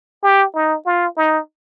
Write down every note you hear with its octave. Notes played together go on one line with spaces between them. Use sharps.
G4
D#4
F4
D#4